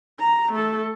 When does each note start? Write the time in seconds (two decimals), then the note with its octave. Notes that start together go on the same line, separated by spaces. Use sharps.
0.19 A#5
0.52 A3 A4